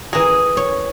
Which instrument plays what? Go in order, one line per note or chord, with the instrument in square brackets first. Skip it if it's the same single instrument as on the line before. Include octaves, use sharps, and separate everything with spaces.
[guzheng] E3 A#5 [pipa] G#4
[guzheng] C#5